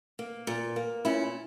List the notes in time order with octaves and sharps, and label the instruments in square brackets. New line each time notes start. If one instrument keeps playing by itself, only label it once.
[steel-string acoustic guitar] A#3
A#2
A#3
A#2 C#4 E4